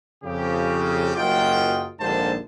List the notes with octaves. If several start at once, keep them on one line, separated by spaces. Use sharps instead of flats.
F2 C#3 G4
F#1 F#2 F4 D#5 G5
A#1 D#2 G#2 D3 C5 A5